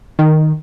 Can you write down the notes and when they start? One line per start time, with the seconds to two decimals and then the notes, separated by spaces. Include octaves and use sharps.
0.19 D#3